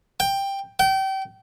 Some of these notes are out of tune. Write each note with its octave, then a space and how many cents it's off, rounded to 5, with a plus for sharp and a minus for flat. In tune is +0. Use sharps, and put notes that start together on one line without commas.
G5 +10
G5 -30